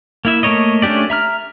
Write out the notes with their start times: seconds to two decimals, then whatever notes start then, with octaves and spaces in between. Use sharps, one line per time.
0.25 A#3 E4 E5
0.43 A3 A#3 A#4 C#5 D#5
0.82 A3 C#4 D4 G4 D5
1.10 E5 A#5 F6